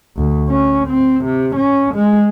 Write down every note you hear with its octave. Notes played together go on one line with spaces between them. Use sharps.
D2
C#4
C4
C3
C#4
G#3